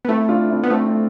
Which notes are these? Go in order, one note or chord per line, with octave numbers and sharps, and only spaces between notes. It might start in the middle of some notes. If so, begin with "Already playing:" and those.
B3
A3 C4 E4
D4 F4
C4 E4
B3
A3 C4 E4
C4 E4